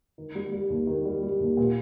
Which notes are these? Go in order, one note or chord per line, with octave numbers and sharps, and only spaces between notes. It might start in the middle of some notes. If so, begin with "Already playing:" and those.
D#3
G3
G3
D#2
D#3
G3
G3
D#2
A#2